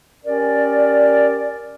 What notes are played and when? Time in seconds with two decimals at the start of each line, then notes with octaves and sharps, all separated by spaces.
0.25 C#4 G4 A#4 D5